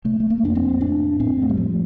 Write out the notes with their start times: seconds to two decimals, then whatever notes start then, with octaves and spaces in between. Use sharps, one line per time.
0.04 C3 A3
0.20 A3
0.30 A#3
0.43 F2 D4
0.55 C4
0.81 A2 D4
1.20 A2 C4
1.42 A3
1.50 G3
1.57 A2 F3